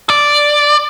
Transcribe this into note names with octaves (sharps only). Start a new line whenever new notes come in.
D5